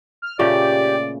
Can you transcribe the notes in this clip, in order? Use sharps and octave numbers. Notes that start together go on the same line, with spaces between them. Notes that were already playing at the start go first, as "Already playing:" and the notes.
F6
A#2 C#3 A3 G4 D5